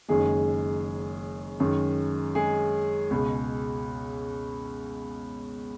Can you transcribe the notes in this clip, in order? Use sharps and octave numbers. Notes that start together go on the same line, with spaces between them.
F#1 F#2 D#3 G#3 G#4
F#2 D#3 G#3
G#3 G#4
C#2 B2 G#3